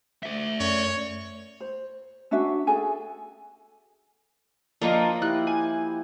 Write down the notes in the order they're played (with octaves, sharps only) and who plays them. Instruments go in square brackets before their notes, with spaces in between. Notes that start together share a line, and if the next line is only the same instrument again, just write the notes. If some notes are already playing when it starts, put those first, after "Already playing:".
[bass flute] A3 [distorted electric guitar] D5 E5
[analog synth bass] F#2 [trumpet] C#5
[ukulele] C5
C#4 D4 F#4 E5
G#4 A4 G#5
[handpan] F3 D#5 [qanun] A#3 [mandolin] D4 D#4 F4
[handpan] E4 G4 [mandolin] F#6
[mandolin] G#5